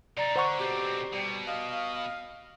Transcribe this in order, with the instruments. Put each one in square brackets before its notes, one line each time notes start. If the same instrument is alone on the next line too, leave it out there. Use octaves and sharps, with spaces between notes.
[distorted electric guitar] C3 D#4 [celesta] D5 A#5 A6
[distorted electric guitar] D3 [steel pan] C5 F#5 C#6
[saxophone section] B2 G4 [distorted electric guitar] D3 C4
[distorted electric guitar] B2 [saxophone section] G3
[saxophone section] D#5 F5